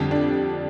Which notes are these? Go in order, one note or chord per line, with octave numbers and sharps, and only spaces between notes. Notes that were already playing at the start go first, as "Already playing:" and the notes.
Already playing: F2 D3 G3 G4
D4